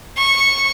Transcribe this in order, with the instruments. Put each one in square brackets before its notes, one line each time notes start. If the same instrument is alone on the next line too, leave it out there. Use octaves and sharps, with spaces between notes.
[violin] C#6